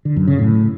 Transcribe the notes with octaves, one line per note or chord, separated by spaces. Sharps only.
D3
F#2
C#3
A2